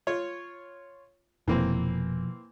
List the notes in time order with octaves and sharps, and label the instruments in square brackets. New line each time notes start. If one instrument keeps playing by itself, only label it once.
[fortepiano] F4 C#5
[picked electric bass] F1 [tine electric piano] B2 F3 [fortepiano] E3 A#3 C4